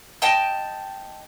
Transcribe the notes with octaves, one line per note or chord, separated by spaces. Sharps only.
D#5 G5 A5